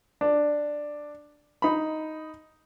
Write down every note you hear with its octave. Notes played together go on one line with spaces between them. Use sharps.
D4
D#4 B5